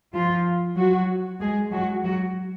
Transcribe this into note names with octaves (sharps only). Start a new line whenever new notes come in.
F3 F4
F#3 F#4
G#3 G#4
F#3 F#4
F#3 F#4